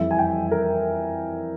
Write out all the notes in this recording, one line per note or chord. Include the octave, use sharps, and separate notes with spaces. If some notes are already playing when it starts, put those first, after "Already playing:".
Already playing: F2 E3 G3 E5
G#5
G5
A#4